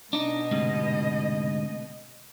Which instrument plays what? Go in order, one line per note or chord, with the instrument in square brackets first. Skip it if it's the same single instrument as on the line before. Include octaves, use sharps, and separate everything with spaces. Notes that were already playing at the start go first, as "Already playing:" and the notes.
[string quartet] B2 D#5 [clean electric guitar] D4 D#4
[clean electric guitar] D2 G#2 C3